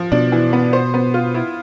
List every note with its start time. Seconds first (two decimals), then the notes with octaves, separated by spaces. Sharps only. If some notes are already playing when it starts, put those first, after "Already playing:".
Already playing: F3
0.12 B2 D4
0.32 E3
0.53 B3
0.73 C5
0.94 B3
1.14 F4
1.34 E4